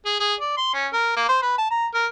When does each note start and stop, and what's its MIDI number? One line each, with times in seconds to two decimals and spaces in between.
0.05 0.17 68
0.20 0.34 68
0.40 0.55 74
0.57 0.73 84
0.74 0.87 61
0.93 1.13 70
1.16 1.27 58
1.29 1.38 72
1.42 1.58 71
1.58 1.67 81
1.71 1.87 82
1.94 2.07 70